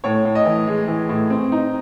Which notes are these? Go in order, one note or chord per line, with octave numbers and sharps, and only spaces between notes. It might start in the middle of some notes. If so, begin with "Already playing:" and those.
A2 C#5
A2
D#5
E3
G#3
E3
A2
C4
D#4